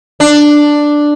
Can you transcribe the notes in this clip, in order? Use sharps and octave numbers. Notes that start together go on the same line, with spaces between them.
D4